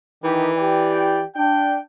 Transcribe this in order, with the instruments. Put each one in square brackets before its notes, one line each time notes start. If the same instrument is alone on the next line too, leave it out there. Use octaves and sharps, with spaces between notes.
[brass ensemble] D#3 G4 [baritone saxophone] E3
[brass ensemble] G4 D5 G5
D4 G5